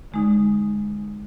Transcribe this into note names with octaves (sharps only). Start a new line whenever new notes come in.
D3 G#3 D#4